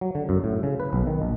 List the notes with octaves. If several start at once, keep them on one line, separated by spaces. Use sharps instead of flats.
F#3
D3
F#2
A2
C#3
B4
B1
D#3
A#1